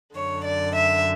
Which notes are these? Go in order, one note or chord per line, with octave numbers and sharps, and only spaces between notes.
F#2 D3 C#5
D5
E5